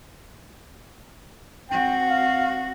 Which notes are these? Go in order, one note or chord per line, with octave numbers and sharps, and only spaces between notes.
C4 F#4 G5
F5